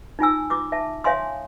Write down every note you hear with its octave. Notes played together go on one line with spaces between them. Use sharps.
D#4 F4 G#5 E6
F4 D6 D#6
E5 A5
C#5 E5 F5 G#5 C6 D#6